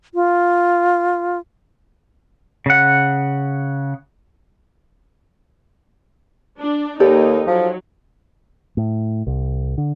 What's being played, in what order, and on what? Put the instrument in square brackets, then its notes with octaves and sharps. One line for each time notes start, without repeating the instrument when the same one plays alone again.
[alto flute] F4
[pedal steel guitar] C#3 F#5
[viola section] D4
[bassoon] D#2 [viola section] A#3 D#4 [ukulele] G4 A4 D5
[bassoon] F3 [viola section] F#3
[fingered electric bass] A2
C2
D3